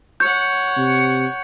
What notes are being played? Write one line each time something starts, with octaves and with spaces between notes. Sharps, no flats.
C#5 F#5 G6
C3